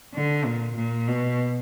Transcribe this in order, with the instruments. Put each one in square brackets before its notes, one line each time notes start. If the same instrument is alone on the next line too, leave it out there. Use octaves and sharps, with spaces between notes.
[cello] D3
A#2
A#2
B2